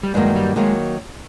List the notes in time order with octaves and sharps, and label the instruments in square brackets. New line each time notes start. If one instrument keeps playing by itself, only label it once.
[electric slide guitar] G3
[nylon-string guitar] G2 D#3 F#3 A#3 [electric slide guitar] G#3
[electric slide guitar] G3
[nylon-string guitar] D#3 F#3 A#3 [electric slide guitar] G#3